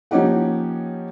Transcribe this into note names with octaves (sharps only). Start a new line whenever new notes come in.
F3 A#3 C#4 D#4 G4 F#5